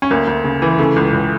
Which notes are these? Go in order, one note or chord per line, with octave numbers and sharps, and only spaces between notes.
C#4
D2 A#3
D2
C#3
E3
C#3 A3
C#2
C#2